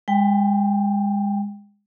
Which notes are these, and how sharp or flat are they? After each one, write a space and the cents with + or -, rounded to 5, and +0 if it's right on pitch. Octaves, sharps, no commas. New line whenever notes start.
G#3 -30 G5 +0